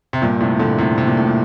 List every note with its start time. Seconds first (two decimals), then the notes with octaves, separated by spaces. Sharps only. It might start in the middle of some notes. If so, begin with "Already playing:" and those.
0.13 C3
0.22 G2 A#2
0.40 A2 C3
0.59 A#2 D3
0.78 A2 C3
0.98 C3
1.07 A#2
1.17 A2
1.27 A#2